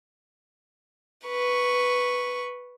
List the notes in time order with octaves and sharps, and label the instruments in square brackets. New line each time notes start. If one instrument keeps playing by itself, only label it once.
[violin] B4 C#6